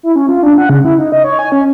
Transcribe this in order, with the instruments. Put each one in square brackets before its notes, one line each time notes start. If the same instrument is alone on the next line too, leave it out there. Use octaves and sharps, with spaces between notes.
[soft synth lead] E4
C#4
F4
D4
F#5
C#3
E4
D#4
D#5
C#5
G#5
C#4